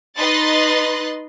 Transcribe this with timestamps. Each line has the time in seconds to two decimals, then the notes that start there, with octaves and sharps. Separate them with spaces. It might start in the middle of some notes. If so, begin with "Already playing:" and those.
0.16 D#4 B4 D#5 C6 F#6 A6